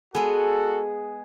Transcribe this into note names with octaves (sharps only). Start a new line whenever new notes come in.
G#3 B3 F#4 G#4 A4